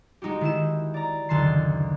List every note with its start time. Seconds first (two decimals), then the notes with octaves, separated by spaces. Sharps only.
0.22 G#3 D#4 F#4 G4
0.41 D#3 E4 E7
0.94 D5 A#5
1.29 F#1 D2 D#3 A5 C6 C7